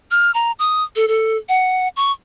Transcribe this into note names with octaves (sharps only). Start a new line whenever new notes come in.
F6
A#5
D#6
A4
A4
F#5
C#6